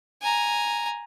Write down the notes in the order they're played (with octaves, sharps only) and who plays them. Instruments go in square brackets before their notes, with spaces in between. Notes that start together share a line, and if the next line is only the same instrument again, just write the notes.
[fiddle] G#5 A#5